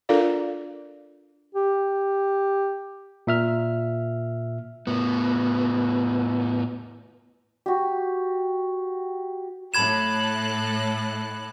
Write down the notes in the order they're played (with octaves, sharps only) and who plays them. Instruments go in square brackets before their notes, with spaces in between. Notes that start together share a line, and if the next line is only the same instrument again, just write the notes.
[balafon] D4 F4 A4 A#4 D5 F5
[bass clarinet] G4
[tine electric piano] A#2 E5 F6
[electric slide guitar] A2 B3
[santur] F#4 G4
[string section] A2 A4 F#6 [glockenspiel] B5 G#6 E7